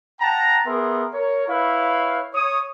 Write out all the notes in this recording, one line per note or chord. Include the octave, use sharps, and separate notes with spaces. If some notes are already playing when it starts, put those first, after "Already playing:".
F#5 G5 A5 A#5
B3 G#4 A#4 E5 C6
A#4 C#5
E4 B4 C#5 F5
C#5 D#6